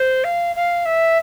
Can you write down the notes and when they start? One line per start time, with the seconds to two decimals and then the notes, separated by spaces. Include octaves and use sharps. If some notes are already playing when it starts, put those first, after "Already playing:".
Already playing: C5
0.24 F5
0.56 F5
0.86 E5